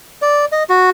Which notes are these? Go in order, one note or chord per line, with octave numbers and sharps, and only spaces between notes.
D5
D#5
F#4